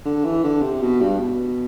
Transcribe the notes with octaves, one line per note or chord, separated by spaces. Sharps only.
D3
E3
D3
C3
B2
G2
B2